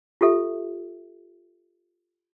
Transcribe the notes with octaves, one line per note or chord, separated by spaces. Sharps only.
F4 G4 A4 E5